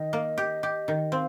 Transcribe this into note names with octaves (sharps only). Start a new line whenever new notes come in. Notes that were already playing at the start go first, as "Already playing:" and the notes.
Already playing: D#3 D#5
A#3
G4
G4
D#3
C4 F5